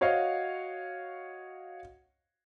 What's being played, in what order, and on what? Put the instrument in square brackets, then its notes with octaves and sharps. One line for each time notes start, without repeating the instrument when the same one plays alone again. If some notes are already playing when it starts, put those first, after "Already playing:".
[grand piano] F#4 C#5 D#5 F5